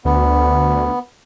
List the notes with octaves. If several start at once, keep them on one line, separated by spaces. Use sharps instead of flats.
D2 B3